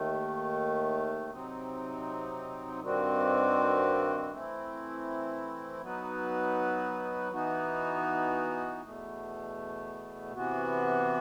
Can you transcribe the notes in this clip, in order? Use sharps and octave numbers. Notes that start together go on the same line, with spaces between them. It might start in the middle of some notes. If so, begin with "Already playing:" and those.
Already playing: D#2 D#3 A3
C3 F#3 C4 D#4
G2 D#3 G3 C4 F#4
E3 A3 C4 E4
F#3 B3 D#4 F#4 B4
E3 B3 D#4 F#4
E2 B2 A3
C3 E3 B3 F#4